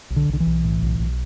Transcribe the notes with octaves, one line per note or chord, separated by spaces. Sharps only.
B1
D3
B1 D3
E3
B1
A2
B1
B1